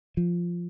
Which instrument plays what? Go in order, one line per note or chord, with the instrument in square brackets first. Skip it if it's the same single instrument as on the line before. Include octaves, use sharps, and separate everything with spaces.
[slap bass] F3